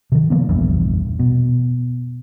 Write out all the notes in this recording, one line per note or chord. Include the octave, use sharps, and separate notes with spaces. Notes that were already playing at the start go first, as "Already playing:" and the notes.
C3 D#3
D#3 F3 A#3 B3
F1 A#1 E2 G2
B2